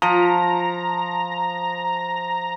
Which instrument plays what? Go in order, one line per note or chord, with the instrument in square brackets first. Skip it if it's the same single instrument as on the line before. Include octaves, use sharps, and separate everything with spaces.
[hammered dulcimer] F3 [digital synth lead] A#5